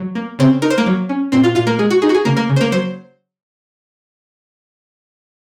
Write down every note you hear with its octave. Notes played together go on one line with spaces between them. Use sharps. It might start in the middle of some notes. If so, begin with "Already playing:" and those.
Already playing: F#3
A#3
C#3 C4 C5
D#4 A#4
C5
A#3 A#4
F#3
C#4
A#2 C4 C5
F4 F5
A#2 F4 F5
A#3 A#4
G#3 G#4
F#4
D#4 G#4
F#4
G#4
C#3 A#3 A#4
A#3 A#4
C#3
C5
A#3 A#4
F#3 C5